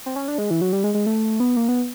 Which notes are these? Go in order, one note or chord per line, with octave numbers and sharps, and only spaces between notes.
C4
C#4
D4
G#3
E3
F#3
G3
G#3
G#3
A3
B3
A#3
B3